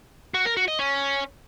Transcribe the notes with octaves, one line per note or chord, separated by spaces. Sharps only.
F#4
A#4
F#4
D#5
C#4